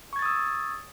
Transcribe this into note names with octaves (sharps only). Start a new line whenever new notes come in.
C#6 D#6 E6 G#6 A6